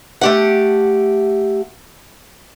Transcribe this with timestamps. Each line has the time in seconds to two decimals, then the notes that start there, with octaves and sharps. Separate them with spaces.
0.21 A3 G4 F#5